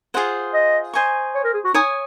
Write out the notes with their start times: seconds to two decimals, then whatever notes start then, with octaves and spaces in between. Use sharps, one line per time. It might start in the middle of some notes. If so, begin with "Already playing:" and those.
0.14 F4 G#4 C5 F#5
0.54 D#5
0.93 C5 D#5 G#5 C#6
1.35 C#5
1.44 A#4
1.54 G#4
1.65 F#4
1.74 D#4 C#5 G#5 D#6